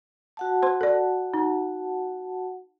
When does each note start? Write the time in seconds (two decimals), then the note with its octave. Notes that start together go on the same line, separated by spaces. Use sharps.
0.37 F#4 F#5 A5
0.63 C5 C6
0.81 A4 D5
1.34 D#4